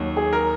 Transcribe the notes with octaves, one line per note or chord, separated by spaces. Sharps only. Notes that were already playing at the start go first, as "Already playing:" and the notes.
Already playing: D#2 F#3
G#4
A#4